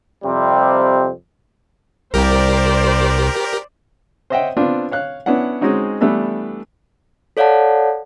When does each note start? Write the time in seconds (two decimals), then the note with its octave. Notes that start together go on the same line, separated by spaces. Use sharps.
0.24 F2 C3 G3 C4
2.14 C2 G4 A#4 C5 D5
4.30 C5 C#5 D#5 E5 F#5 G5
4.57 B3 C4 D4 F4
4.91 C#5 F5 F#6
5.26 B3 C#4 D4 E4 F#5
5.61 G#3 C4 C#4 D#4 F#4
6.01 E3 G3 A3 B3 D4 A4
7.37 A4 C#5 D5 F5 F#5 A5